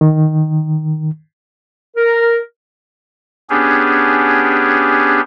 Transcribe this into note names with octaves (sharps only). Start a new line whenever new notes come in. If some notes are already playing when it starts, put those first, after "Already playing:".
D#3
A#4
B3 C#4 D4 G4 G#4